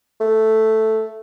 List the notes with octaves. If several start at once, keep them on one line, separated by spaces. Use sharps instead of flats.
A3